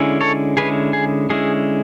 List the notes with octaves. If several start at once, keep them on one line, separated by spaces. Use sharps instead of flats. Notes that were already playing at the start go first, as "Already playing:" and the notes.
Already playing: D3 G#3 C#4 E4
A4 C#5
D3 G#3 C#4 E4 G#4 B4
G#4
D3 G#3 C#4 E4 G#4